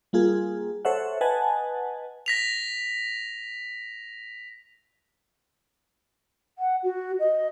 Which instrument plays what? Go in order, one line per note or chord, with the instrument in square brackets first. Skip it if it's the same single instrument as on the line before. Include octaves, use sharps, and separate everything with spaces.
[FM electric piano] G3 A#3 F4 G#4
A4 C5 C#5 E5 F#5
B4 D#5 F#5 G#5 A5
[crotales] A#6 B6 F7
[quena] F#5
F#4
D#5